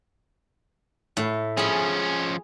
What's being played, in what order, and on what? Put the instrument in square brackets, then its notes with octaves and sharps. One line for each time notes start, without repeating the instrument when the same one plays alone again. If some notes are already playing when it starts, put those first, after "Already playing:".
[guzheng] A2
[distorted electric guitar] F3 C#4 [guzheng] G#4 B5